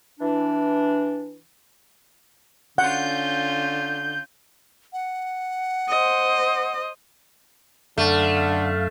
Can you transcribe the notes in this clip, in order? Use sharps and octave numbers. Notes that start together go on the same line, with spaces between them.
E3 D4
D3 C#4 F4 F#5 G6
F#5
C5 D#5
F#2 D3 A3 F5